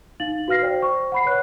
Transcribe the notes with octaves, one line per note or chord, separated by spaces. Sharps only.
D#4 F5 A6 F#7
F#4 B4 F5 F6 A#6 C7
C5 D5 G5
C5 C#6
F#5 B5 C7
B4 C#5 F#6